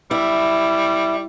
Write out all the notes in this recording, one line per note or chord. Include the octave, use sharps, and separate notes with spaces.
G3 E4